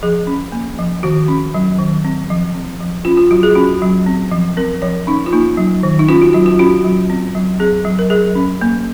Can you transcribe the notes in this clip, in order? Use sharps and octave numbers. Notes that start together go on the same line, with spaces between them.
F3 G#4
C#4
A#3
F3
D#3 F#4
C#4
F#3
D#3
C4
F3
C4
F3
C#4 F4
F4
F#3 F#4
G#4
C#4 F#4
F#3
C4
F3
C4 A#4
F3 C#5
C#4 D#4
F4
A#3 D#4
F#3
D#3
D#4
C#4 F4
F#4
F#3 F4
F4
C#4 F#4
F#3
C4
F#3
C4 G#4
F#3
A#4
F#3 G#4
C#4
A#3